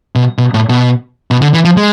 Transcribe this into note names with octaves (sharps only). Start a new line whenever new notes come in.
B2
B2
A2
B2
B2
D3
E3
F3
G#3